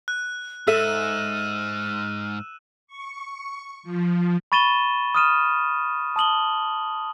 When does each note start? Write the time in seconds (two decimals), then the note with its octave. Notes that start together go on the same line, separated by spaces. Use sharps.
0.08 F#6
0.67 G#2 A4 E5 E6 F6 D#7 E7
2.87 C#6
3.83 F3
4.52 B5 C#6 A6 D#7 E7 G7
5.15 D#6 F6 D#7 E7
6.16 A5 D#6 F#7 G7